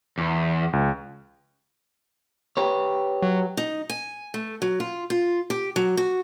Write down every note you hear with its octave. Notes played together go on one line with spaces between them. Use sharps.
E2
C#2
G4 B4 C#5
F#3
D#4
G#5
A3
F#3
F4
F4
G4
F#3
F#4